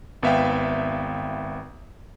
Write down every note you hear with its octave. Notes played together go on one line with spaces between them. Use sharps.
G#1 B3 E5 F5 G5